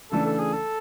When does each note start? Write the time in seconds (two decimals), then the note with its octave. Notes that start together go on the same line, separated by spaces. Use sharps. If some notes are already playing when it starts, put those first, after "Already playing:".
0.11 C#3 E3 A3 D4 A4
0.25 A4
0.40 G#4
0.54 A4